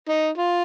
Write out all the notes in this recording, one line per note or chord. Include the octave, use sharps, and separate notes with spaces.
D#4
F4